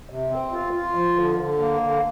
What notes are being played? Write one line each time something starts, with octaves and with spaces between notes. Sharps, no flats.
C3
C4
F4
F4
F3
D3
D3
A#3
D3